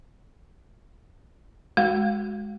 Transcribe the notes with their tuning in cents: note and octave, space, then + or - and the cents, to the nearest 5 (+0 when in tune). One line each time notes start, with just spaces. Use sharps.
G#3 +0 F#4 +0 F5 +5